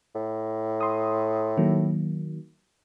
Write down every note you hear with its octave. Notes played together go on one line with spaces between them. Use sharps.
A2
C6 D#6
D#3 F#3 A#3